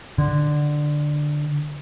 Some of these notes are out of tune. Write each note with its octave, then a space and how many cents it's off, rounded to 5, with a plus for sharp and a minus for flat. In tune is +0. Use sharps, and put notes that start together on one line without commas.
D3 +10